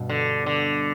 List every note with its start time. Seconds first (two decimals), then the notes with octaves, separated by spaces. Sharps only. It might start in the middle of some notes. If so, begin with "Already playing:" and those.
Already playing: G2 B2
0.09 D3
0.46 D3